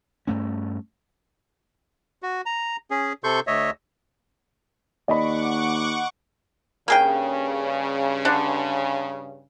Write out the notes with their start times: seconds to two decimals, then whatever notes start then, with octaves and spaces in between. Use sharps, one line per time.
0.27 G2 A3 C#4
2.23 F#4
2.46 A#5
2.91 C#4 G#4
3.24 C3 A4 C6 C#6 G6
3.47 D2 C#5 D#5 E5
5.08 D#2 D5 D#5 F#5 B5 C#6 D6
6.88 G2 C#3 A#3 G#4 G5
8.25 D3 D4